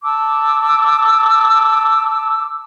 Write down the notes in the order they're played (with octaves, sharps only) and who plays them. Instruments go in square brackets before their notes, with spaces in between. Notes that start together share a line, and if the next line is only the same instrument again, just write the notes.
[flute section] A5 D6 E6